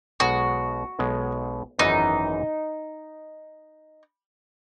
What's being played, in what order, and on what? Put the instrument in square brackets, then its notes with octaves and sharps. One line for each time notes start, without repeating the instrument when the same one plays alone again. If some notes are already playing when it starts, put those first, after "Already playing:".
[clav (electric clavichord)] B1 B2 G#3 [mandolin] F#4
[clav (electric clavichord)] B1 B2 G#3
[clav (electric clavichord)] G#1 F#2 E3 B3 [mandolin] D#4